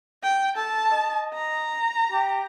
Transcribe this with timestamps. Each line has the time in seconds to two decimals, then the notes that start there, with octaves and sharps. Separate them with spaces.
0.23 G5
0.57 A4 A5
0.92 D#5
1.34 A#5
2.12 G4